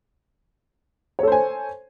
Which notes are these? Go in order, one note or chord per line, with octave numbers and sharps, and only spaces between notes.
A4 C5 C#5 G#5